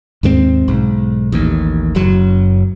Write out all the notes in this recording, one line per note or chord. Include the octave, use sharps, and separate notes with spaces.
D#2 G#2 G3 C4
B1 G#2
A1 D#2
F#1 F#2 F#3